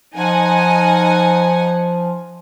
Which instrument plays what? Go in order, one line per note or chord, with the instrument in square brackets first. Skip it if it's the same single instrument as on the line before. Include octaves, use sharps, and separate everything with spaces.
[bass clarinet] F3 [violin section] D#4 F#5 G#5